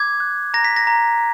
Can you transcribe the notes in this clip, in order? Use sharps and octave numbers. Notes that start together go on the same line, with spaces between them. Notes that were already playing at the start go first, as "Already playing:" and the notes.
Already playing: D6 G#6
F#6
A#5 A#6
B6
A#6
A#5